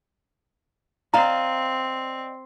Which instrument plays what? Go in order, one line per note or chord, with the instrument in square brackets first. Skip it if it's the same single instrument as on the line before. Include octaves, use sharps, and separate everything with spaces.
[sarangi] C4 [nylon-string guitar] D5 D#5 F5 [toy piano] A#5